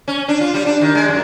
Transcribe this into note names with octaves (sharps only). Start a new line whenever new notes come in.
C#4
D4
F4
G3
D4
D#3
G#3
F#2